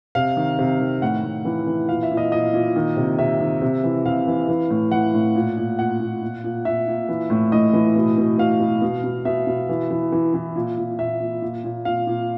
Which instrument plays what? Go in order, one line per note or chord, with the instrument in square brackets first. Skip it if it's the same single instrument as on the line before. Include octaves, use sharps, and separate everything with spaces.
[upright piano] C3 F5
D#3
C3
D#3
A2 F#5
A2
E3
E3
A#2 F5
E5
A#2
D#5
A#2 D#5
A#2
D#3
C3
C3 E5
D#3
C3
E3
C3 F5
E3
E3
A2
E3 F#5
A2
A#2
A#2
A#2 F#5
A#2
A#2
A#2
A#2 E5
A#2
E3
A2
A2 D#5
E3
B2
B2
B2 F5
B2
B2
B2
B2 E5
B2
E3
E3
E3
E3
A#2
A#2
A#2 E5
A#2
A#2
A#2
A#2 F5
A#2